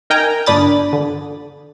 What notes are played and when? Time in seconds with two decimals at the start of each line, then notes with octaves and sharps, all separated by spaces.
0.10 D#4 A#4 G5 G#5 A#5
0.46 G1 D4 D5 B5 D#6 A6
0.93 D3